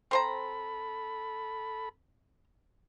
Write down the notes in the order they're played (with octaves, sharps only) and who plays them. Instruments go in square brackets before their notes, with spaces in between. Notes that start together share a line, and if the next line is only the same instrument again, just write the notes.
[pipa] C4 C5 A#5 [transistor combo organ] A4 B5